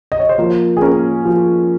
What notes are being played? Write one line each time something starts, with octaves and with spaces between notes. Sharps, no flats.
D#5
C#5
C5
F3 A#3 A#4
G#4
A#3 C#4 A#4
F3